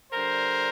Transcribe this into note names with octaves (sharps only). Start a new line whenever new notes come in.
D3 G3 A#4 C5